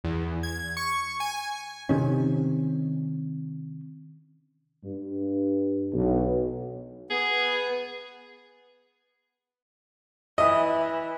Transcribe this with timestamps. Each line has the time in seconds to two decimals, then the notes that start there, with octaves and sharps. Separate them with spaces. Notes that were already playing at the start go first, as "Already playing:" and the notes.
0.04 E2
0.43 G#6
0.77 C#6
1.20 G#5
1.36 G#5
1.89 C3 D#3 C#4
4.84 G2
5.93 B1
7.10 B3 G#4
10.38 E3 D#5 E5